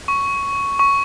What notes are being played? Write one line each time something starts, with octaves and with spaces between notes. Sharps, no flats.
C#6
C#6